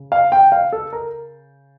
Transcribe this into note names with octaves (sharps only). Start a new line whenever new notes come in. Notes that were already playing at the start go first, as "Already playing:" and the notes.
Already playing: C#3
F5
G5
F5
A4
A#4